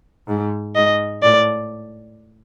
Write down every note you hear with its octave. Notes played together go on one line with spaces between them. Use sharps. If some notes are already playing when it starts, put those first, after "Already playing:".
G#2
G#2 D#5
A2 D5